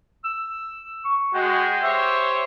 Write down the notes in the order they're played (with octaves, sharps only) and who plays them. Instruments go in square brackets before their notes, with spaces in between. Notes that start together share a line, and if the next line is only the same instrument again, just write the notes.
[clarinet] E6
C#6
[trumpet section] G#3 [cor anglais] F#4 [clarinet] G5
[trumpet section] G4 C5 C#5 [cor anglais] E5